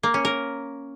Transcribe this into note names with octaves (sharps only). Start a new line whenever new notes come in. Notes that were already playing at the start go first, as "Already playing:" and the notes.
A#3
C#4
A#4